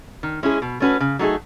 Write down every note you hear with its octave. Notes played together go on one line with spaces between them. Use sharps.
D#3
G#3 C#4 E4 G#4
B2
A3 C#4 F#4 B4
C#3
F#3 A3 D#4 G#4